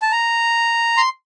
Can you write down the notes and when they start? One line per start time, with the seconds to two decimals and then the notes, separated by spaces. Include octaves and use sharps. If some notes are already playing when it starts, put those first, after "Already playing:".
0.02 A5
0.12 A#5
0.97 C6